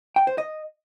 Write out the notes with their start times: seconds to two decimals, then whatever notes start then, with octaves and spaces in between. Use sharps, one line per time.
0.16 G5
0.27 C5
0.38 D#5